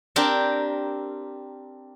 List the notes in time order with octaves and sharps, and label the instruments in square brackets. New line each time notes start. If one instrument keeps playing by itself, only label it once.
[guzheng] C4 D4 G4 A#4